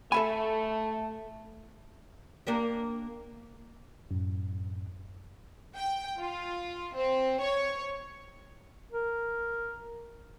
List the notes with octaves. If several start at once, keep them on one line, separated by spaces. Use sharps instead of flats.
A3 A4 E5 G#5 B5
A#3 D4 G4
F#2 A2
G5
F4
C4
C#5
A#4